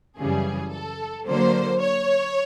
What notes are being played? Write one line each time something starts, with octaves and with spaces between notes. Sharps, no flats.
F#2 C#3 E3 G3 G#4
A4
D3 F#3 A#3 C5
C#5